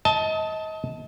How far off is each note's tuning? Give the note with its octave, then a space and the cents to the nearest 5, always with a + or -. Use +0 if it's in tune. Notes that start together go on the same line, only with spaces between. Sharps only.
D#5 +30 A5 -5